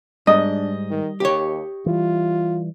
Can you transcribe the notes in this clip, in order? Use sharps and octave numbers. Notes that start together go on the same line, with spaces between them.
G#2 G3 D4 D#5
D#3
D#2 G4 C#5
E3 G3 F4